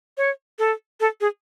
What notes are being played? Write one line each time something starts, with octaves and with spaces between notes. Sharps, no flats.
C#5
A4
A4
G#4